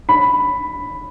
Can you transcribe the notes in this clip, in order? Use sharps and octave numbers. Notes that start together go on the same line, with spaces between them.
B5